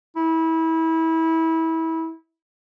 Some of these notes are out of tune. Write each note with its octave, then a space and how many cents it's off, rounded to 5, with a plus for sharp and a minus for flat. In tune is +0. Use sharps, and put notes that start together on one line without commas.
E4 -25